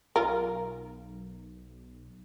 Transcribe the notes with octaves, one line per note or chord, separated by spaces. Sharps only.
B1 F4 A#4